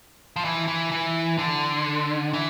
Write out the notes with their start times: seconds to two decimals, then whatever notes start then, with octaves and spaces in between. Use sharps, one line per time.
0.36 F3
0.45 E3
0.68 E3
0.92 E3
1.38 D3
2.33 E3